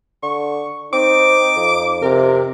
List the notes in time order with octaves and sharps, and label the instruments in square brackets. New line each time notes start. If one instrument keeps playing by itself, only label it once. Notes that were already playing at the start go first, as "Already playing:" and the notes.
[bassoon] D3 [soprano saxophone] C#6
[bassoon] C4 [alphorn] D#4 [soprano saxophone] D6
[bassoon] F2
[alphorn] C3 [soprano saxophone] A#4